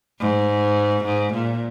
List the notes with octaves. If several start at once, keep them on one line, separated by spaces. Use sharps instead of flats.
G#2
G#2
A#2